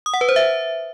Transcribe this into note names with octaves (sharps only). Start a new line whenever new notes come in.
D#6
F#5
B4
C5
E5